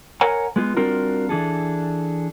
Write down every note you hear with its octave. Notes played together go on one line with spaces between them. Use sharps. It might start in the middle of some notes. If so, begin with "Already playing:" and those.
A#4 C#5 F#5 G#5 A#5
G#3 B3 F4
G3 C4 D4 F4 F#4 A#4
E3 D4 G#4 A4